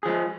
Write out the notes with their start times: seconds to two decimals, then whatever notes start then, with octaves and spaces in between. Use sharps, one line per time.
0.03 G#4
0.06 F3
0.08 G#3